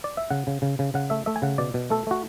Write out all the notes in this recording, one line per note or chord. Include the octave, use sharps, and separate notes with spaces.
D5
E5
C#3 F#5
C#3
C#3
C#3
C#3 F#5
A3 E5
A3 E5
G#5
C#3 F#5
B2 D5
B2
A3 A4
A3 F#4